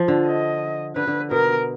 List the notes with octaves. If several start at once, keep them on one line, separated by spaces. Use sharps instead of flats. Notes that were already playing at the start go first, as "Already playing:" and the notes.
Already playing: F3
D3
D#5
D3 B4
D3
B2 A#4